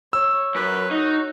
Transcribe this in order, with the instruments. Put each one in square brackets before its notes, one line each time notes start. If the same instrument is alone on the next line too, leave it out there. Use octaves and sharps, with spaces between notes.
[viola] C#5 [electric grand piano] E6
[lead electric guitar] F#2 [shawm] B4 [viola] C#5
[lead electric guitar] D#4 [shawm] F#4